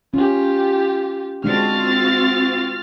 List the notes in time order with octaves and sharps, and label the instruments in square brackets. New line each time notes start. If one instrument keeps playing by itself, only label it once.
[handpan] C#4 [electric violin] F4 G4
[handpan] G#3 D4 [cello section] C4 F4 F#4 [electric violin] F6 A6